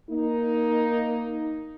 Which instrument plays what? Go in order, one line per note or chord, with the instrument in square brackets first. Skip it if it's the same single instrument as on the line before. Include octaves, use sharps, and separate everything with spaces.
[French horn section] A#3 D#4